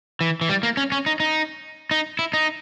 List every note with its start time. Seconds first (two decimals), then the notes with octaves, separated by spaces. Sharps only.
0.21 E3
0.41 E3
0.49 G3
0.63 A#3
0.77 C#4
0.92 C#4
1.06 D#4
1.20 D#4
1.91 D#4
2.19 E4
2.34 D#4